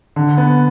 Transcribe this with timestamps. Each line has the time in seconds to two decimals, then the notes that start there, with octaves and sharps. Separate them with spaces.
0.16 D3
0.38 B3